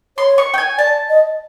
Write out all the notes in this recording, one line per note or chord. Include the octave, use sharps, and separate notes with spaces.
C#5 C6
C#6
G5
G#5
D5 A5
D#5